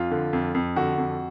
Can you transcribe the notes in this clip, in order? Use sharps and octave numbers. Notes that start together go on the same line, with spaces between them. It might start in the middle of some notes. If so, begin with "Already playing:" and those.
Already playing: F2 F4
D3
F2
F2
D3 F#4
F2